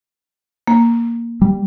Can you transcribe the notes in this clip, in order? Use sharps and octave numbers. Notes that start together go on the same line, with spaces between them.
A#3
G3